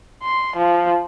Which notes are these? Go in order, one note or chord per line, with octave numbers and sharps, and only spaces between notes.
C6
F3